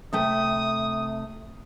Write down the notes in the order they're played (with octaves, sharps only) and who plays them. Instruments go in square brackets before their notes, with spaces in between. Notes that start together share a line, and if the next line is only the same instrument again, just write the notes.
[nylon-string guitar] C3 A3 G5 [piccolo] D#6